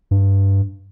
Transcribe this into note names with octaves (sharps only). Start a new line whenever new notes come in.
G2